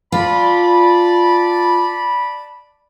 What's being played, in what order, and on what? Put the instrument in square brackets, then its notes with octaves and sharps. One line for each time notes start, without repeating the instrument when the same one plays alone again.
[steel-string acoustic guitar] F4 [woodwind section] D5 A5 B5